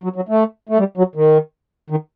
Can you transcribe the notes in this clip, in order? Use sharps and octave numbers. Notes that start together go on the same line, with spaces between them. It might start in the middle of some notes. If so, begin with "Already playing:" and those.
F#3
F#3
A3
A3
G3
F#3
D#3
D#3